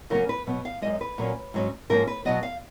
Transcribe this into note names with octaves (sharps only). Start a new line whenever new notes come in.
C#3 F#3 A#3 C#4 A#4
B4
B2 F#3 B3
F5
F#2 C#3 G#3 D#5
B4
A#2 F#3 A#3 C#4
G#2 F#3 C#4
G#2 F3 A#3 C#4 A#4
B4
B2 F#3 B3 D#5
F5